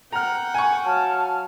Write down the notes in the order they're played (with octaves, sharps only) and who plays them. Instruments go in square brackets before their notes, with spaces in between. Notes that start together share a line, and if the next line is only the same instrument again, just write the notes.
[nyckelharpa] F#5 G5 [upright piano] A#5 F6
[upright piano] G#5 C#6
[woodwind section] F#3 F5 F6 [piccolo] A5